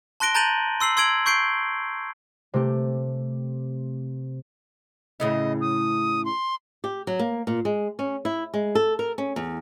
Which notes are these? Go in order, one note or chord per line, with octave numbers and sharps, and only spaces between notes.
A5 C6 F#6 A#6 D7 G7
A5 A#5 G6 A6 D#7 F#7
C6 E6 C7 F#7
C6 E6 G#6 D7 F#7
C#6 G6 C7 D7 G7
C3 A3 G4
A2 C#3 E4 D#5
D#6
C6
G4
F#3
A#3
A#2
G#3
C#4
E4
G#3
A4
A#4
C#4
E2